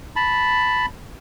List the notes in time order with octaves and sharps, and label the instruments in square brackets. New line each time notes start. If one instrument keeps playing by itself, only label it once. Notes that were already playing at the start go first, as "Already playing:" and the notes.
[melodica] A5 B5